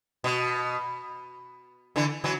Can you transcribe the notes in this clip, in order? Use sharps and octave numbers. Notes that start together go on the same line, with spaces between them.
B2
D3 E3
E3 F#3